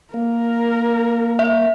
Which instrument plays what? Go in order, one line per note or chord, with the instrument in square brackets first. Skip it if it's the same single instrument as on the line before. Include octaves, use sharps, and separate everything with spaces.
[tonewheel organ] A#3 [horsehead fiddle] A#4
[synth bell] E5